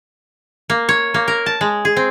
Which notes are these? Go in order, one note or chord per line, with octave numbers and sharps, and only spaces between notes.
A#3
C#5
A#3
A#4
A5
G#3
G#4
C4